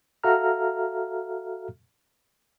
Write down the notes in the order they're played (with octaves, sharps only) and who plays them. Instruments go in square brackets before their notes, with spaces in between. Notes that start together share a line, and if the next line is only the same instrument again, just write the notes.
[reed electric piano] F#4 A4 E5 F5 A#5 F6